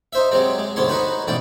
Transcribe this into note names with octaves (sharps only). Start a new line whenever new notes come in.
D#4 C5 E5
C3 F#3 G#3 C4
G#3
D2 G#2 C3 B3 C#5 C6
D#4 F#4 B4 C5
A1 G#2 B2 D5 G5